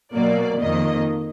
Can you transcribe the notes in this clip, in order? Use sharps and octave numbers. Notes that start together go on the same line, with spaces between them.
B2 F#3 A#3 D5
F2 D#3 A#3 D#5